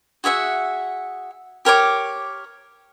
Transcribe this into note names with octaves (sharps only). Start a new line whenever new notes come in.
F#4 G#4 E5 F#5
G4 A#4 C#5 D6